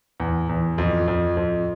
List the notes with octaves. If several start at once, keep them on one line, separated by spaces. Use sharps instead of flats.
E2
E2
F2
F2
F2